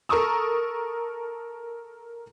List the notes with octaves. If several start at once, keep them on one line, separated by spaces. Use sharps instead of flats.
A4 A#4 A#5 C#6 D#6 E6